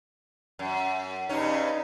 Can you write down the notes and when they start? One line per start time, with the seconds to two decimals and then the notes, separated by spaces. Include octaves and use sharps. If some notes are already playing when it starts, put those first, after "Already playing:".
0.59 F#2
1.29 G2 C#3 C#4 D#4